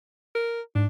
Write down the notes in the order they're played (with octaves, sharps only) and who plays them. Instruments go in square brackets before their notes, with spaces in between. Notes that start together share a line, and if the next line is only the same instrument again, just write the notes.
[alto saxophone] A#4
[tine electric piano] G#2 [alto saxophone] D4